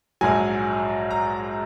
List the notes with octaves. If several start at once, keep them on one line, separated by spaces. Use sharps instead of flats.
A#1 G#2 F#3 G#5
A#5